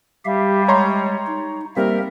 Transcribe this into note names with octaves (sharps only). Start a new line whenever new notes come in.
G3 G4 E5 F5
G#3 C#5 A#5 C6
D#4
G3 A#3 C4 A#4 E5